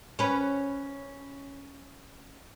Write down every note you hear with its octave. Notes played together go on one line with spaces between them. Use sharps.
C#4 B4